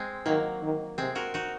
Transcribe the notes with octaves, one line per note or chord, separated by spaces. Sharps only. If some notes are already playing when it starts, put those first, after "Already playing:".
Already playing: G#3 C4
D#3 F#3 A#3
D#3
C3 G#3 C4
F#4 A#4
D#4 F#4